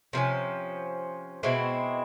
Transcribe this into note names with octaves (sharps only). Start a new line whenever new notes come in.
C3 F3 A#3 C#4
B2 G#3 C4 E4